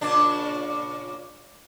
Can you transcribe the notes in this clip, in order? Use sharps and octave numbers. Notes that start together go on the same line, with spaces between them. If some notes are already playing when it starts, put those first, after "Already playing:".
A#2 C#3 D4